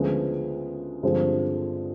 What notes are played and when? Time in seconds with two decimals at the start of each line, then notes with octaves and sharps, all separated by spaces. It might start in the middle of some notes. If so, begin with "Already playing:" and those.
Already playing: D2 C#3 F3 G#3 B3
1.03 G2 D3 F3 G#3 C4